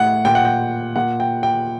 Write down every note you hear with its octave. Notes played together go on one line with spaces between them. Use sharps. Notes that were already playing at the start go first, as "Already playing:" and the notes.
Already playing: A2 F#5
A#2 G5
F#5
G5
A#2 F#5
G5
G5